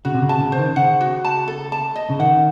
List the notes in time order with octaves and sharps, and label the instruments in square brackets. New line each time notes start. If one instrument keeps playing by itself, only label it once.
[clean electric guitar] C#3 [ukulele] F#4
[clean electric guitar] C3
C#3
[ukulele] A5
[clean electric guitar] C#3
[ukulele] C5
[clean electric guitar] D#3
[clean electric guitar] C#3 [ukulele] F#5
[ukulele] F#4
A5
A4
A5
D#5
[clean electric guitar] C#3
[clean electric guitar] D#3 [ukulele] F#5